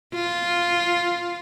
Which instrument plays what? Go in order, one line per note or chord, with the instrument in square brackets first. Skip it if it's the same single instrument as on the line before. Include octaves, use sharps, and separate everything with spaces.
[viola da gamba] F4